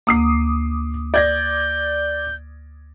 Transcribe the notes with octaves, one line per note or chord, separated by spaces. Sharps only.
D2 A#3 D6 D#6 C7
D5 G6 G#6 A#6